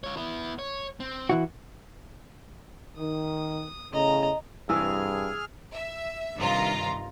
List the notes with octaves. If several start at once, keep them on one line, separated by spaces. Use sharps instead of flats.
F4 C#5
B3 E4
C#5
C4
E3 E4 F#4
D#3 D#6
E2 A2 C#3 D#5 A#5
C2 G2 E3 G#4 G#5 E6 F6
E5
G2 C3 D#3 F4 A#5